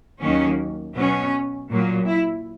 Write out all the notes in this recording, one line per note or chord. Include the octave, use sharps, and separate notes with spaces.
D#2 D#3 F#3 A#3 C#4
B2 F#3 B3 C#4
A#2 F#3 A#3
E4